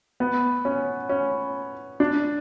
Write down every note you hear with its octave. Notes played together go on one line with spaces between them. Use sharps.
B3
C#4
C#4
D4